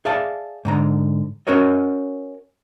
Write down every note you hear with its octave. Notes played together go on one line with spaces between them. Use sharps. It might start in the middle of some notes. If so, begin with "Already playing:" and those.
G#4 D5 E5 F5 A5
G#2 D3 A#5
C#4 F#4 A#4 C#5 D#5